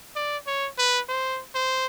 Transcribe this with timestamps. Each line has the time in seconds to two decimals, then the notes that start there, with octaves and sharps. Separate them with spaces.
0.16 D5
0.47 C#5
0.78 B4
1.09 C5
1.55 C5